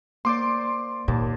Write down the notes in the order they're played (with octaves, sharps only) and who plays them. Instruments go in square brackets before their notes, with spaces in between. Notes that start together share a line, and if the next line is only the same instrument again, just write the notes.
[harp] A#3 C5 D5 [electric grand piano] C6 D6
[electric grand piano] D#2 [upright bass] A#2 [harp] A5